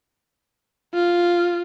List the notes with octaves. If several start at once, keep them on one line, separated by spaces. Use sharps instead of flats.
F4